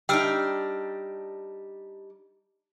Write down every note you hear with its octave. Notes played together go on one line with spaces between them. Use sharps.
G3 D4 D#4 G5 E6 F6